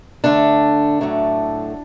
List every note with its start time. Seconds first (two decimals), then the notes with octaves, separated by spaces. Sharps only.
0.24 D3 A3 D4
1.01 A2 F#3 A3